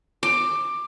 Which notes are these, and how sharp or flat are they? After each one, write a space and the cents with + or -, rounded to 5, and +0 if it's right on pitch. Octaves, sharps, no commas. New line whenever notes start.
D6 +15